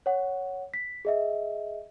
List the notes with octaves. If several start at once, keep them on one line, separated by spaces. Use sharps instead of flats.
C#5 F#5
B6
G#4 D#5 E5